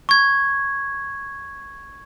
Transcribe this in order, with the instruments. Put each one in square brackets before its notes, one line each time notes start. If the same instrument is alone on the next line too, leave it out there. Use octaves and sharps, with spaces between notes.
[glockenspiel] C#6 G#6